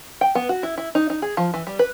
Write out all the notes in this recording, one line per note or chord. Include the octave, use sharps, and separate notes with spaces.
G5
B3
F#4
E4
E4
D#4
D#4
G#4
F3
E3
G3
B4